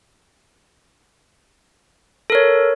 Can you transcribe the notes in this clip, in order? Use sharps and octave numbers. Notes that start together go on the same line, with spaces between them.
A4 A#4 C#5